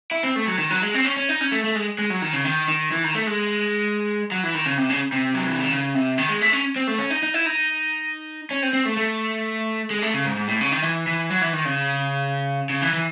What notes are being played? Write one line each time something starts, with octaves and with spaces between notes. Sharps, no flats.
E4
C4
A3
F#3
D#3
F#3
G#3
C4
C#4
C#4
D#4
C#4
A3
A3
G#3
G#3
F#3
D#3
C#3
D#3
D#3
E3
D#3
A3
G#3
F#3
E3
D#3
C#3
C3
C#3
C3
F#3
E3
D#3
C#3
C3
D#3
G#3
A3
C#4
C4
A3
C#4
D#4
D#4
E4
D#4
C#4
C4
C4
A3
A3
G#3
A3
C#3
G#2
G#2
A2
C#3
D#3
E3
E3
F#3
E3
D#3
C#3
C#3
E3
E3